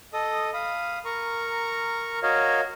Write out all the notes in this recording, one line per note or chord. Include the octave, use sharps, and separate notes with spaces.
A4 D#5 D#6
F5 B5 D#6
A#4 A#5 C#6
F#4 A#4 C#5 D#5 F5